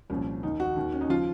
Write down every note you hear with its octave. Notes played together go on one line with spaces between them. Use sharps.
C2 A#2 F3 C#4
D#2 D#3 D#4
F#4
D#2 D#3
C#4
D#4
C#3 F3 F4